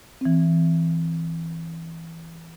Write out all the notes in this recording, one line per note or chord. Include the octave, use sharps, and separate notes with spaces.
E3 C4